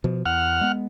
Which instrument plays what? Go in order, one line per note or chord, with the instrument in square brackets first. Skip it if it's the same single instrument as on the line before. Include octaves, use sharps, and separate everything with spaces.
[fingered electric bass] B2 F3
[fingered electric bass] E2 [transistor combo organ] F#5 F6
[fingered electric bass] G#3 B3